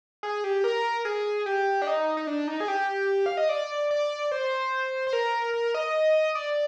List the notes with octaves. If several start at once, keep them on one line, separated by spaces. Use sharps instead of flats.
G#4
G4
A#4
G#4
G4
D4
D#4
D#4
D4
D#4
G#4
G4
F5
D#5
D5
D5
C5
C5
A#4
A#4
D#5
D5